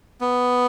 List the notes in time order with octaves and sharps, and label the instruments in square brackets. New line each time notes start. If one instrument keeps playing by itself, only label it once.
[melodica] B3